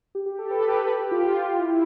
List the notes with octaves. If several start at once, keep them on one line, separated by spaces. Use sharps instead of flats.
G4
G4
A4
B4
G4
B4
G4
F4
E4